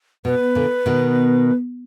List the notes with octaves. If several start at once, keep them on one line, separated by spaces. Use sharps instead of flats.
B2 B4
A#2 D3
B2 D#3